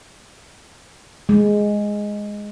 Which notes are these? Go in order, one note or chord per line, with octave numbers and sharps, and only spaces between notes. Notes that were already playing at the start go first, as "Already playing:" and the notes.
G#3